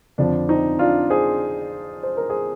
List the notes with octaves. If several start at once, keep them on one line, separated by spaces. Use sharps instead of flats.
F2 D3 F3 D4
C4 D#4
D4 F4
G#4 C5
C5
A#4
G#4 C5